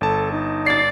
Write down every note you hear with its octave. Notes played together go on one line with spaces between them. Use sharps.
G1 A4 A5
D#4
D5 A6 C7